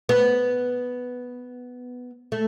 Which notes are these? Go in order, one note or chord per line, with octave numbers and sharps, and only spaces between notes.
B3
A3